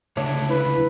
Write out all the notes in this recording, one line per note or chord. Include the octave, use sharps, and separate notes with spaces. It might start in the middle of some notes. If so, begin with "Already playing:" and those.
C#2 D3 A3 D4 C#5
E4 B4